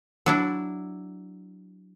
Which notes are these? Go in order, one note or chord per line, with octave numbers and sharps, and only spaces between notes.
F#3 D4 E4